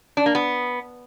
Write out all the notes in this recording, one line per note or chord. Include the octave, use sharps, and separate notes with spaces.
D4
A#3
B3